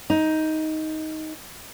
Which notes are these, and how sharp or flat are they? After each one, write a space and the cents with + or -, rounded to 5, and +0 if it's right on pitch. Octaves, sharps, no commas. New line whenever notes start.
D#4 +10